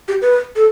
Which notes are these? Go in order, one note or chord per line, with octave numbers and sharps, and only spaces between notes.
G4
B4
A4